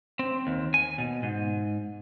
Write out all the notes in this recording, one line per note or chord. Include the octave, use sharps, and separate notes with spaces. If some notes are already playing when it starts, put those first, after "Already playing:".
C4
D#2
G#5
B2
G#2